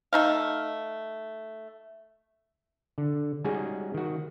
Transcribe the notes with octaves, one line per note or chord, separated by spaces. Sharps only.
A3 D#4 F5
D3
G3 G#3 C#4 D#4 F#4 G#4
D#3 F#4